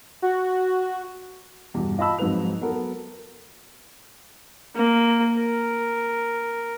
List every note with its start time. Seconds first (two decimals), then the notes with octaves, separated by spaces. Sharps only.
0.22 F#4
1.74 E2 G2 B2
1.98 F4 D#5 F5 A5 B5 E6
2.19 F2 G#2 F#3 D#4 B4 F7
2.61 F#3 B3 A4 A#4
4.75 A#3
5.36 A#4